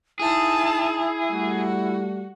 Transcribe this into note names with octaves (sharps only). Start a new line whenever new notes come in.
D#4 E4 G#4 A5
G3 A3 F#4